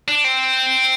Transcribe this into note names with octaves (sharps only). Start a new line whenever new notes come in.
D4
C4